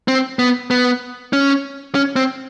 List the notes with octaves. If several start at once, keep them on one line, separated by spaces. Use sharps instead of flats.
C4
B3
B3
C#4
C#4
C4